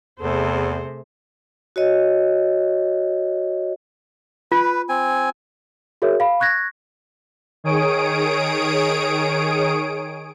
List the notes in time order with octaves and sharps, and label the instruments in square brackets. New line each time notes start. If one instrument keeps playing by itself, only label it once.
[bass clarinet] E2 [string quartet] C3 [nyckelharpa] A3 G#4 [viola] C5
[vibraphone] F#4 C#5 D#5
[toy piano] F4 [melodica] B4
[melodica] C4 G#5
[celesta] F#4 G#4 A#4 C#5 E5
F5 B5
C#6 F#6 G#6 A#6
[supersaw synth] D#3 G#4 C#5 D#6 D7